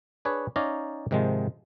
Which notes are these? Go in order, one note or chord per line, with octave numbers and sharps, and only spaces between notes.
D4 G#4 B4 C#5
C#4 D#4 C#5 D5 F5 A#5
G#2 C3 D#3 F3 G#3